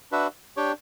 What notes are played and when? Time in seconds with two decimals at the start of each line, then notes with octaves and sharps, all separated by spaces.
0.12 D4 F#4 B4 E5
0.57 D4 G4 C#5 G5